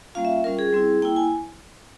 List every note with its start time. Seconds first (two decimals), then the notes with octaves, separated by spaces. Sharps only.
0.15 G3 A#3 C#4 F4 F5
0.25 E5
0.44 G3 C#4 F4 A#4
0.59 G#4
0.73 G3 C4 E4
1.02 A#3 E4 G5
1.16 G#5